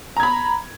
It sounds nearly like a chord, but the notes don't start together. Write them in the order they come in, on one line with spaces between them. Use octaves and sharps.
A#5 G#6 B5